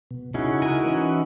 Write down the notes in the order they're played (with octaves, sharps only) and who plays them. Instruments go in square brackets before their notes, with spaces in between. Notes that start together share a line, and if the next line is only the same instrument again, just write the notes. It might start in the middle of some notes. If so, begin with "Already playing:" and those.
[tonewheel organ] B2
[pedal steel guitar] C#3 C#4 [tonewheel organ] D#4 E4 F#4
[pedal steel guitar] G#3 A#4 G#5
E3 C#4